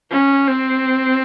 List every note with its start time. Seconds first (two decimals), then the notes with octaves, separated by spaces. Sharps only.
0.11 C#4
0.49 C4